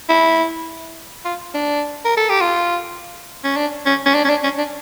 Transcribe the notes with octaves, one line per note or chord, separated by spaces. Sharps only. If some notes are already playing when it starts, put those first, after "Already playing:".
E4
F4
D4
A#4
A4
G4
F4
C#4
D4
C#4
C#4
D4
C#4
D4
C#4
D4